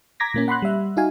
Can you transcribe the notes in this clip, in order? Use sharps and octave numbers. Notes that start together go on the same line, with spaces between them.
A#5 D6 G#6 A#6 B6
A#2 A#3 C#4
F#5 B5 C6 F#6
G3 E5
D#4 F#4 F5 G#5